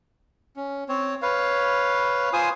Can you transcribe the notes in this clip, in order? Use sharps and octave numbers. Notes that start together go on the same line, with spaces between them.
C#4
C4 C#5
B4 C#5 F5
F4 C5 G#5 D#6